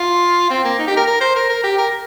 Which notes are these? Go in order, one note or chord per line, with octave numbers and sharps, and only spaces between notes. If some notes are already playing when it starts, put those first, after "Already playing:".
Already playing: F4
C4
A#3
D#4
G4
A#4
A#4
C5
A#4
A#4
G4
A#4